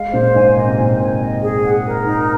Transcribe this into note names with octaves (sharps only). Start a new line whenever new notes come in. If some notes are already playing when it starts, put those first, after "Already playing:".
Already playing: G#3 F5
A#2 C5
G#2 G#5
A#2 D#5
C3
A#2 C5
G#5
D#5
G#4
F#5
A#4
D#4